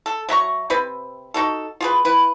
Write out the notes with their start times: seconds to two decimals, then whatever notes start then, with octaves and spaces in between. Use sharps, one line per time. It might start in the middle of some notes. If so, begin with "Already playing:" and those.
0.06 A4
0.29 F#3 E5 A#5 C#6
0.70 C3 C4 B4
1.34 D#4 F#4 A4
1.81 F4 G#4 B4
2.05 E4 B4